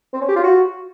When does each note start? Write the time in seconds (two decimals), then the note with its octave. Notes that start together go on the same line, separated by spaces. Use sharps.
0.13 C4
0.21 C#4
0.28 G4
0.36 F4
0.43 F#4